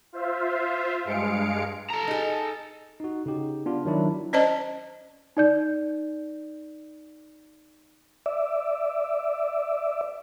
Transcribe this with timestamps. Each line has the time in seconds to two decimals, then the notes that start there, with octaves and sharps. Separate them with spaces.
0.13 F4 C5 E5 F5
1.05 G2 G#3 F5 C#7 D7
1.91 A4 A#5
2.08 D#4 G#4
3.00 D#4 F#4
3.26 C#3 D#4 G4
3.66 B3 D4 F4
3.85 D#3 F#3 D4 E4
4.33 C#4 C5 D5 D#5 A5
5.37 D#4 D5 G6
8.26 D5 E5